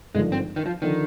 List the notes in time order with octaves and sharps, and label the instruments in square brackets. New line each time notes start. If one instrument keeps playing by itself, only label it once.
[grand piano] G#1 G2 D3 F3 [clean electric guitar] G#3
[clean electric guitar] C4
D#3
F3
[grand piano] D3 F3 [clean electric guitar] D#3